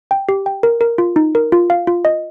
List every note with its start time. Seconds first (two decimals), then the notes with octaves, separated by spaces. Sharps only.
0.11 G5
0.29 G4
0.46 G5
0.63 A#4
0.81 A#4
0.98 F4
1.16 D#4
1.35 A#4
1.52 F4
1.70 F5
1.87 F4
2.05 D#5